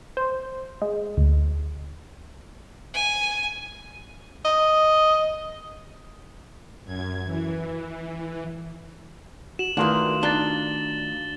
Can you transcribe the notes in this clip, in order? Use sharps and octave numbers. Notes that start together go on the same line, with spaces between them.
C5
G#3
D2
G#5
D#5
F#2 G#6
E3
F#4 E7 F#7
D#3 E3 A3 A#3 D4 F4 F#4
D4 D#4 D5 A6 G7